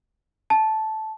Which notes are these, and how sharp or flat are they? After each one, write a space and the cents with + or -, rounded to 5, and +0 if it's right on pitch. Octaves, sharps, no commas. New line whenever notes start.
A5 -10